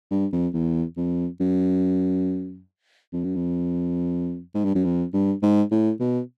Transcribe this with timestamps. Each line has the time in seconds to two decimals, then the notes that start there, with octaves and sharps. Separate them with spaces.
0.11 G2
0.32 F2
0.53 E2
0.97 F2
1.40 F#2
3.12 F2
3.24 F#2
3.35 F2
4.54 G#2
4.64 G2
4.75 F#2
4.84 F2
5.13 G2
5.42 G#2
5.71 A2
6.00 B2